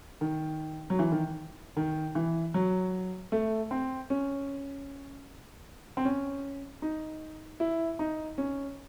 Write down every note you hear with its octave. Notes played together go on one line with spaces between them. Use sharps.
D#3
F#3
E3
D#3
D#3
E3
F#3
A3
C4
C#4
C4
C#4
D#4
E4
D#4
C#4